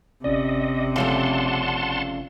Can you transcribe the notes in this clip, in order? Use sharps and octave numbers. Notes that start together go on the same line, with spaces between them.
G1 C3 C#4 D5 D#5
C#3 F3 A3 F#5 A5 C6